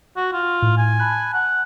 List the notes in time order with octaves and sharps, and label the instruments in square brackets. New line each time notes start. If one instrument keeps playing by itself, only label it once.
[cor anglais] F#4
F4
[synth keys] A2
[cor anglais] G#5
[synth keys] A5 B5 F#6
[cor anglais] F#5